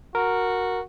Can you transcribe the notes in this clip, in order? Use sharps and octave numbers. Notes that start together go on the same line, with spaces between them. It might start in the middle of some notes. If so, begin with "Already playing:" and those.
F#4 A#4